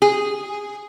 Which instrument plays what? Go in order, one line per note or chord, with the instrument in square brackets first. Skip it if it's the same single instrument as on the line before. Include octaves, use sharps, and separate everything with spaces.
[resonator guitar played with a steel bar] G#4